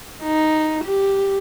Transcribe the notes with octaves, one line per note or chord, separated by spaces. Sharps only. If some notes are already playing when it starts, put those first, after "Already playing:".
D#4
G4